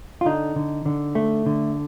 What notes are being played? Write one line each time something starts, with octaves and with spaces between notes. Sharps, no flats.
F4
D3 D#4
D3
D3
A3
D3